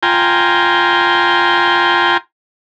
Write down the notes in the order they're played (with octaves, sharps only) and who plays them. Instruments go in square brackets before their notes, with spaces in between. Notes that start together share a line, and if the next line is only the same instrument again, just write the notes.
[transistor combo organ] F4 G5 G#5 A#5 C6